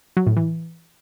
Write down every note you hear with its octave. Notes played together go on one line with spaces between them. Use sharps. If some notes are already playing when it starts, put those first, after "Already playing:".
F#3
A2
E3